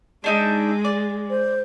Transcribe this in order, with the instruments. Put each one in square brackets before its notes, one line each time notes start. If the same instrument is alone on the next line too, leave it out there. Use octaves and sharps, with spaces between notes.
[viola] G#3 [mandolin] D4 D#4 E5
[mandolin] D5
[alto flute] C5